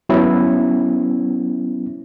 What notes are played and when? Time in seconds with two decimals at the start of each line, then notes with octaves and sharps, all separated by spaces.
0.09 F#3 B3 C#4 E4